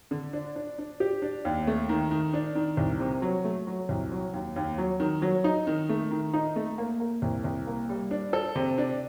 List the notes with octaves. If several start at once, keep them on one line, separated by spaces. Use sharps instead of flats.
D3
D4
D4
D4
G4
D4
D#2
A3
D#3
D#3
D4
D#3
C2
C3
F#3
A3
F#3
C2
F#3
D#2
D#2
F#3
D#3
F#3
D#4
D#3
A3
D#3
D#4
A3
A#3
A#3
C2
C2
A#3
G3
D4
A4
C3
D4